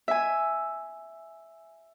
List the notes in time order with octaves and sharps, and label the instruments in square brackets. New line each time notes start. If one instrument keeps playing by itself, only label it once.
[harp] E5 G#5